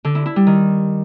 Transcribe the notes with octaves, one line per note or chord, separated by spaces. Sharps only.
D3
E4
E4
G3
D#3